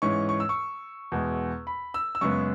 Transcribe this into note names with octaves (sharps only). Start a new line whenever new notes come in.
G#2 E3 C#4 C#6
C#6
E6
C#6
E2 B2 G#3
B5
E6
E6
F#2 C#3 G#3 B3 C#6